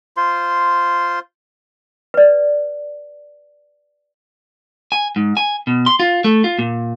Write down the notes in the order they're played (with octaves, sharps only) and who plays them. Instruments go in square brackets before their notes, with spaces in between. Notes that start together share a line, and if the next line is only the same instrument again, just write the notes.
[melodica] F4 C5 C6
[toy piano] B4 D5
[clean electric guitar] G#5
G#2
G#5
B2
C6
F4
A3
F4
A#2